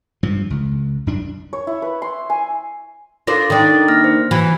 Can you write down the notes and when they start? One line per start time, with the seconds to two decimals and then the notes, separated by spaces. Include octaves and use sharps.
0.23 G2 F3
0.50 C#2
1.07 F#2 D4
1.53 C#5
1.67 E4
1.82 B4
2.02 C6
2.30 G#5
3.27 D4 F4 A4 A#4 C5 A#6
3.50 D#3 D4 A4 D#6 A6
3.88 A#3 F6 A#6
4.04 C5
4.31 E3 F#4